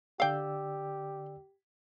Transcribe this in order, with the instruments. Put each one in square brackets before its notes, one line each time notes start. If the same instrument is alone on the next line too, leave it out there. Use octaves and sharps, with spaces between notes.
[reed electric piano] D3 D5 E6 [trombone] G4 [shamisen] F5 G5